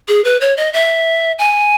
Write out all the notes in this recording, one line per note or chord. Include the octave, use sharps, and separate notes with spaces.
G#4
B4
C#5
D#5
E5
G#5